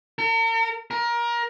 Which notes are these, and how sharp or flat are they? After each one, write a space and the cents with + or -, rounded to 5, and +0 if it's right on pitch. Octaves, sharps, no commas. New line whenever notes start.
A#4 -45
A#4 +25